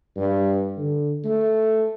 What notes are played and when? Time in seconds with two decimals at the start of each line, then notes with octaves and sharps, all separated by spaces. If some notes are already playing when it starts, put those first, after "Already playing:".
0.16 G2
0.77 D3
1.24 A3